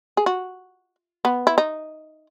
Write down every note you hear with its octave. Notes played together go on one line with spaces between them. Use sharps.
G#4
F#4
B3
E4
D#4